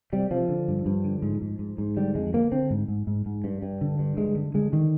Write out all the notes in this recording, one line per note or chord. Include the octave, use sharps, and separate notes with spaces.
C3 G3
C3 F3
D3
G2
G2
D3
G#2
G#2
G#2
G#2
D3 G3
F2 G#3
D3 A#3
D3 C4
G#2
G#2
G#2
G#2
G2
G2
D3
G2
D3 G#3
D3
D3 G#3
D3 D#3